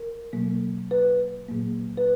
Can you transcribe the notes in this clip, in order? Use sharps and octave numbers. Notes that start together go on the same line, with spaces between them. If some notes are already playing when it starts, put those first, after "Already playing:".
Already playing: A#4
B2 F#3 A#3
B4
A#2 F#3 A#3
B4